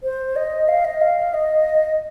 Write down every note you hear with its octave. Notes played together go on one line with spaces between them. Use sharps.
C5
D#5
F5
D#5
F5
D#5